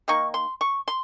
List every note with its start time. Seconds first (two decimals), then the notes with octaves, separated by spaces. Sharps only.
0.08 D#3 A#3 D#4 C#6
0.34 C6
0.61 C#6
0.88 C6